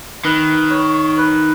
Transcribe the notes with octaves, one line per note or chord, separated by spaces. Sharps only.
D#3 B4
C#5
B4